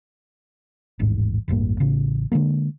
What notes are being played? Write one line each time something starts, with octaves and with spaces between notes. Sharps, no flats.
D#1 A1 G#2
E1 A1 G2 A#3
A1 C#3
D3 F3 G#3 A#3